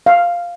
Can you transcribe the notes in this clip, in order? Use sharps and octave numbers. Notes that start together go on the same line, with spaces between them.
F5